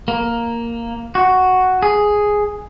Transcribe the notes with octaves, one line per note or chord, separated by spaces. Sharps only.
A#3
F#4
G#4